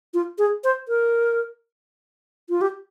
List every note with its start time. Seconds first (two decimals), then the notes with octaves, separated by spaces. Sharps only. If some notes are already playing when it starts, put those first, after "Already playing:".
0.14 F4
0.38 G#4
0.64 C5
0.88 A#4
2.50 F4
2.61 G4